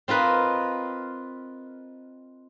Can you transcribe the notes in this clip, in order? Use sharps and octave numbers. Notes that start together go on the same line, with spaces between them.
C4 F4 A#4 B4 D#5